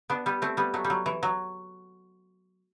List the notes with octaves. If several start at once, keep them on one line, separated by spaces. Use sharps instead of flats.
B3 D4
G3 B3
A3 C4
G3 B3
F#3 A3
G3
F#3
E3
F#3